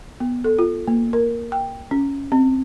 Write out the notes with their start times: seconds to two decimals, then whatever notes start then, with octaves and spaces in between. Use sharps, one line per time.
0.20 B3
0.44 A4
0.59 F4
0.88 A#3
1.13 A#4
1.52 G5
1.91 C#4
2.32 C4